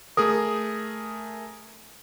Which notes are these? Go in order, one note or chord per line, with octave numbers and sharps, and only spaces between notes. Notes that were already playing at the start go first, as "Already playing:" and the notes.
A3 G#4 A#4 D#6